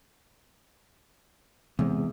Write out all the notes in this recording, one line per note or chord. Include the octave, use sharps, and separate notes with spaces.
E2 C3 G#3 C4